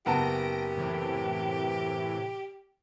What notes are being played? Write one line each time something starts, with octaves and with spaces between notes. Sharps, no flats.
F#1 B3 G4 A5 A#6 D7
A2 C3 E3